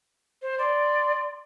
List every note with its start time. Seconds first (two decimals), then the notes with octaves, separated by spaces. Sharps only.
0.42 C5
0.59 D5 C6